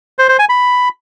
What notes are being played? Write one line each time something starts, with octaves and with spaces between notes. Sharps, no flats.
C5
C5
G#5
B5